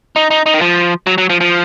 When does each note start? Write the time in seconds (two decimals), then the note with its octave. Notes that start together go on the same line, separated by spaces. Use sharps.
0.16 D#4
0.31 D#4
0.46 D#4
0.54 D#3
0.61 F3
1.07 F#3
1.18 F#3
1.30 F3
1.41 F3